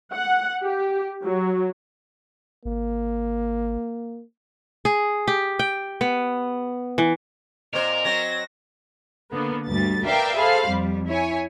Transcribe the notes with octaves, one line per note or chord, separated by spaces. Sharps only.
F#5
G4
F#3
G#1 A#3
G#4
G4
G5
B3
E3
A#2 C4 A#4 C5 D#5
F#3 C4 A#6
D3 A#3 B3
D2 G2 G3 A6
A#4 B4 D5 E5 F5 G5
G#4 A4 C5 F5 B5
F2 G3
E4 C#5 G#5